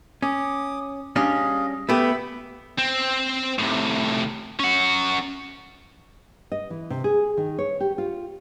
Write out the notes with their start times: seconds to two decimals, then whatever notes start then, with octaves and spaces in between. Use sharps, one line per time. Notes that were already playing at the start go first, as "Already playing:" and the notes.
0.22 C#4 D6 D#6
1.16 G3 C#4 D4 G#4 D#5 F5
1.89 A3 B3 G4 E5 B5
2.78 C4
3.59 A2 C3
4.60 C#4 F#5
6.52 D#5
6.70 E3
6.90 C3
7.04 G#4
7.37 D#3
7.59 C#5
7.80 G4
7.98 F4